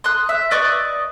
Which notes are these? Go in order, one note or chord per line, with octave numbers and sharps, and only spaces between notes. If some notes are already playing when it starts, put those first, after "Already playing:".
C6 D#6 F#6
E5
B4 D5 D#5 C#6